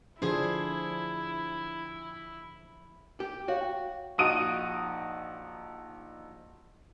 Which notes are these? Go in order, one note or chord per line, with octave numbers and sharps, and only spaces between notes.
D3 F3 D4 E4 G#4 C5
G4
F#4 C#5 F5
G5
A#1 D#4 F#4 D#6 D7 D#7